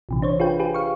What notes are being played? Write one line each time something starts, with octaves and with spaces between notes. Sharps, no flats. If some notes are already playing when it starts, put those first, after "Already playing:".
A#1 C3 E3
D4 C5 C#5
F4 G#4 B4 G5
F4 G4 G#4 B4
F5 C#6